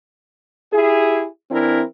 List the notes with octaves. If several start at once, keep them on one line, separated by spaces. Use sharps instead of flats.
E4 G4 G#4
E3 C4 D4 E4 A#4